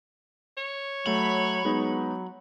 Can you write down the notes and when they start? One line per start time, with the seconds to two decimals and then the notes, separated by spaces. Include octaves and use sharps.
0.57 C#5
1.07 F#3 A3 B5
1.65 F#3 G#3 B3 D#4